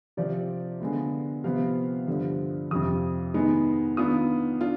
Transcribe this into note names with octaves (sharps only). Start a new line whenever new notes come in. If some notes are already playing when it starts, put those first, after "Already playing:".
C3 F3 C4 D5
D3 G#3 B3 F4
C3 F3 B3 F5
G2 D3 F3
F2 C3 F3 D#6
D#3 G#3 B3 D#4
D#3 B3 D4 F4 D#6
D4 F4